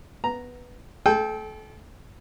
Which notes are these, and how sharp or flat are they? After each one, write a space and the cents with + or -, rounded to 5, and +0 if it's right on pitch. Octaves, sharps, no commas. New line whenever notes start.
B3 +0 A#5 +0
A3 +0 A4 -35 G5 +0